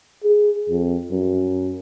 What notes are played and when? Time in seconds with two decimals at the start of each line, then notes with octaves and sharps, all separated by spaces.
0.24 G#4
0.69 F2
1.11 F#2